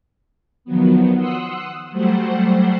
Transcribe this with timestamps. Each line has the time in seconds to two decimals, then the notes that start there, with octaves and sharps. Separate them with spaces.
0.65 D#3 F3 F#3 B3
1.15 F#5 C6 D#6 E6 F#6
1.91 F#3 G3 A3 C5 F#5